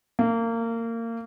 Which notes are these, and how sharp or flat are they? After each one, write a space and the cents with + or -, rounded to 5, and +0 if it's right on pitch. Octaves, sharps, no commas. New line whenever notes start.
A#3 -25